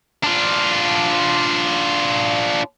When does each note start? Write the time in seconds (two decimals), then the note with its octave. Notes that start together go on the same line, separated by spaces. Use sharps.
0.24 D4 F4